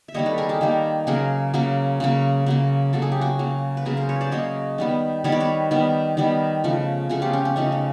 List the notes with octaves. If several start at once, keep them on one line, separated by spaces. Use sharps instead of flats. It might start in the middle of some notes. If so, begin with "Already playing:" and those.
E5
D#3 G3 A#3 C#5 D#5
A4 B4
G#4 A#4
G4 A4
D#3 G3 A#3
C#3 F#3 A#3 G#4 A#4
C#3 F#3 A#3
C#3 F#3 A#3
C#3 F#3 A#3
C#3 F#3 A#3 A4
G#4
G4
F#4 G#4
C#3 F#3 A#3
B4
C#3 F#3 A#3 G#4 A#4
A#4 C5
B4 C#5
C5 D5
C#3 F#3 A#3 C#5 D#5
D#3 G3 B3
D#3 G3 B3 C#5
D5
B4 C#5
D#3 G3 B3
D#3 G3 B3
C#3 F3 A3
C#3 F3 A3 F#4 G#4
F4 G4
C#4
C#4
C#3 F3 A3 C#4 D#4
D#4